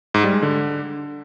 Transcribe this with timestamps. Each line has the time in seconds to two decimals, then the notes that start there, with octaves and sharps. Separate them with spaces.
0.14 G#2
0.24 G3
0.33 G#3
0.42 D3